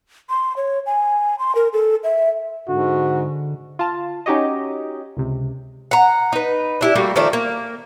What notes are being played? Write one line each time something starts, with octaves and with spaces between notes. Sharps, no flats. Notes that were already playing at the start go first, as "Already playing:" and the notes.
C6
C#5
G#5
C6
A#4
A4
E5
G#2 D3 F#4
F4 A5
C#4 D#4 F#4 G4 C#5 D#5
C#2 C3
F#5 A#5
D#4 B4
D4 E4 G4
G3 A3 A#3 F#4
D#3 F3 A3 D5
A#3